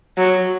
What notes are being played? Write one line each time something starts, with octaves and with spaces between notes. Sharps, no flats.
F#3